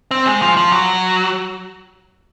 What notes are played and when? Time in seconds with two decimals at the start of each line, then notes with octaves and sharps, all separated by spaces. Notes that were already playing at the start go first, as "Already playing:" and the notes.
0.11 C4
0.27 G#3
0.42 F3
0.57 F3
0.72 F#3